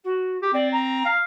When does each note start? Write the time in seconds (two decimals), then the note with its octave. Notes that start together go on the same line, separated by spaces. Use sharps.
0.04 F#4
0.42 G4
0.53 C4 D5
0.72 A#5
1.05 F5